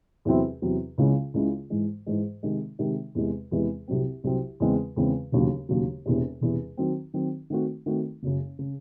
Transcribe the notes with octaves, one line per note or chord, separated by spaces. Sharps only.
E2 C3 F#3 C4 E4
E2 C3 F#3 C4 E4
C#2 C#3 G#3 C#4 E4
C#2 C#3 G#3 C#4 E4
G#2 E3 G#3
G#2 E3 G#3
C3 D#3 G#3
C3 D#3 G#3
E2 C3 E3 G#3
E2 C3 E3 G#3
C2 C3 F#3 C4
C2 C3 F#3 C4
E2 C#3 G#3 C4
E2 C#3 G#3 C4
E1 D#2 C#3 F#3
E1 D#2 C#3 F#3
E1 E2 C3
E1 E2 C3
D#3 F#3 C4
D#3 F#3 C4
D#3 A3 C4 F#4
D#3 A3 C4 F#4
F#1 F#2 C#3
C#3